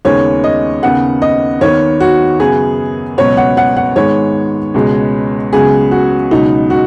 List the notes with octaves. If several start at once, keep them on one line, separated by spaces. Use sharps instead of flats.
D#2 C#3 G#3 B3 C#5
D#5
D#2 C#3 B3 F#5
D#5
D#2 D#3 B3 C#5
F#4
F#2 C#3 F#3 B3 G#4
C#2 B2 F#3 B3 C#5
F#5
F#5
F#5
G#2 D#3 G#3 B3 C#5
C#2 B2 G#3 B3
C#2 C#3 F#3 B3 G#4
F#4
C#2 B2 F#3 B3 D#4
F#4